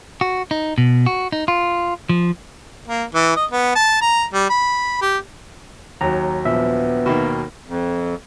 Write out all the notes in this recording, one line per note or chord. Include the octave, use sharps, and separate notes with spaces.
F#4
D#4
B2
F#4
D#4
F4
F3
A#3
E3
D#5
B3
A5
A#5
G3
B5
G4
D#2 F#3 A#5
A#1 F3 B3 E5
B2 D#3 A#3
F2